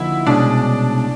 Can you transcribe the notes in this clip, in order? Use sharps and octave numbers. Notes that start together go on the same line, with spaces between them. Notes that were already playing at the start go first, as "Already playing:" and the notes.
Already playing: D3 F3 A#3 D#4 E4 F#4
C2 B2 G#3 C#4 D4